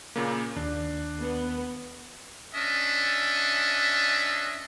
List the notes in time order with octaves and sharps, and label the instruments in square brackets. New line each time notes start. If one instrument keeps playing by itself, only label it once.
[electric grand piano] A#2 C#3 A#3
[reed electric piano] D#2 [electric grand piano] D4
[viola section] B3
[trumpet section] C#4 D4 D#5 E5